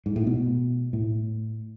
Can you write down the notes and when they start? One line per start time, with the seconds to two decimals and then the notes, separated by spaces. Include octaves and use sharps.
0.06 G#2
0.16 A2
0.27 B2
0.93 A2